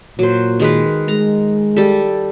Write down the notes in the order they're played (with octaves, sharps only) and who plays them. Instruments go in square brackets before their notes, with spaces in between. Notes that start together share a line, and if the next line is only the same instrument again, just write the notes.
[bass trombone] A#2 [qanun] F#3 C5
[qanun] D#3 G#3 B4
[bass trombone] G#3 [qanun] A#5
[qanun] G3 A4